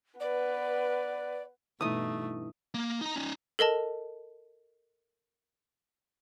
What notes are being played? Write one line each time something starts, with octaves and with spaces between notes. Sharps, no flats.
B3 B4 D5
G2 B2 E3 A3 D#4 D#6
A#3
D#4 A#5
C#4 D#4
A4 A#4 D#5 A5